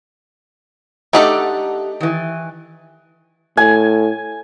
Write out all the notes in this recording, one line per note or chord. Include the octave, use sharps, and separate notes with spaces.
A3 D4 D#4 G4 A4 F#5
D#3 E3
A2 G#5